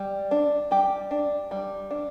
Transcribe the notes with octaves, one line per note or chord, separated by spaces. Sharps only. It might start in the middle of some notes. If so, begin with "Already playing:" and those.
Already playing: G3
D4
G3 G4
D4
G3
D4